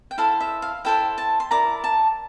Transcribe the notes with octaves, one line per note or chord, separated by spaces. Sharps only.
G5
E4 A4 C5 F5
E5
F5
E4 A4 C5 G5
A5
C6
E4 A#4 D5 A#5
A5